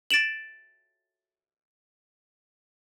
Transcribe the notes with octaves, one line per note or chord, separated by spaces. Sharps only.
A6 D7 E7 F#7